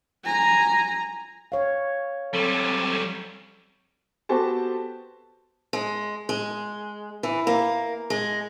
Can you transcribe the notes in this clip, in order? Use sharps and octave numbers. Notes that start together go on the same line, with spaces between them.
G#5 A#5
C#5 F5
F#3 G3 C4 A4 G#5 A5
B3 F#4 G4 A4 C5 A5
G#3
G#3
E3
A#3
G#3